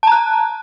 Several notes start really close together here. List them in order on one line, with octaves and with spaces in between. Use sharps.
A5 A#5 F#6